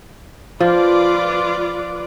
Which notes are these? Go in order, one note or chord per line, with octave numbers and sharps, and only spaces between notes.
F3 F4 B4 D5